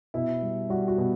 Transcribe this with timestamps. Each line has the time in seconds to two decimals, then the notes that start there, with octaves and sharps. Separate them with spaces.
0.14 B2 E4
0.42 G3
0.69 G3 F#4
0.88 F#4
0.98 B2